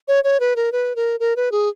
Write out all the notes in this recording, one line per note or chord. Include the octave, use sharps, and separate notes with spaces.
C#5
C#5
B4
A#4
B4
A#4
A#4
B4
G#4